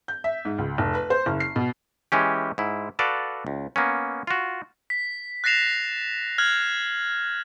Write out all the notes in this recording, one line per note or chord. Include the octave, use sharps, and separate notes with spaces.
G6
E5
G#2
C#2
F1
B4
C5
F#1
C7
B2
E3 G#3 C#4 G4
G#2 E4
F#4 A4 B4 D5 F5
C#2
A#3 B3 C#4
F4 F#4
B6
F#6 A6 A#6 C7 E7 F7
F6 F#6 G#6 F#7